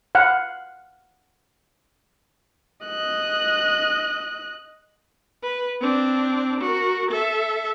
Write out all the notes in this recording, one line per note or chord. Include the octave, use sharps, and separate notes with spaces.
F5 F#5
D#5 F#6
B4
C4 D4
F#4 A#4
A4 E5